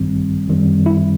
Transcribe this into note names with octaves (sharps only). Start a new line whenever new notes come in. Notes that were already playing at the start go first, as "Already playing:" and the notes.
Already playing: A1 G2 D#3 G3 C4
F#2 D#3 G3 C4
E4